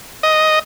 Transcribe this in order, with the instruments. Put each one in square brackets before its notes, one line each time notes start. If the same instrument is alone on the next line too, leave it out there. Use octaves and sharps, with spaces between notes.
[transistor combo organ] D#5